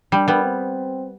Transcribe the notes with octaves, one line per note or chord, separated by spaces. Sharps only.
G3 D4
G3 B3
C4